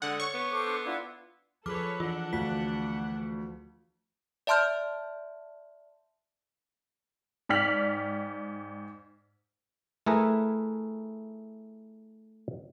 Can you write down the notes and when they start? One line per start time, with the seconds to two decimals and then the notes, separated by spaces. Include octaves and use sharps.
0.02 D3 G#3 F#5
0.20 C#5 C#6
0.34 B3
0.51 A4 C5 D6
0.66 D4
0.85 D4 E4 F4 F#5
1.66 F3 G#4 A4 B4 C#5 D6 F6
2.00 E3 D4 F4 F#5
2.33 D2 F4 B6
4.47 D5 E5 A5 C6 F6 G6
7.49 G#2 D5 G5 F6 B6 F#7
10.06 A3 E4 G#4 A#4 B4 G#5